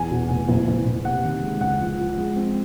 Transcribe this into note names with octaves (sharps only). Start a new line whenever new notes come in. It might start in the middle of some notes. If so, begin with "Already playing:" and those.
Already playing: E2 G#5
B2
F1
F#1
F#1
F#1
C3 F#5
D#3
G#3
C#2 F#5
F3
F3
G#3
C4